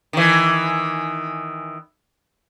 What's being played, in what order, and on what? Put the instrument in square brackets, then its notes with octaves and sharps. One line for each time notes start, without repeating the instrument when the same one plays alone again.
[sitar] D#3 E3